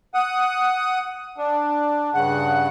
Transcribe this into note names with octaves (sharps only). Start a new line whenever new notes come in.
F#5 D#6
D4
G2 C#3 F#5